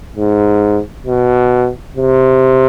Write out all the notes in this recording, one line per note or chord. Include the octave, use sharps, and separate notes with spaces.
G#2
B2
C3